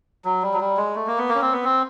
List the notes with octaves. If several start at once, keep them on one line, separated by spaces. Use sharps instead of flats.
F#3
G3
F#3
G3
G#3
A3
A#3
B3
A#3
C#4
C4
B3
C4